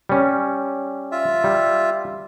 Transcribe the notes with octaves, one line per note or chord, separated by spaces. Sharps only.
G3 C#4
F4 E5
G3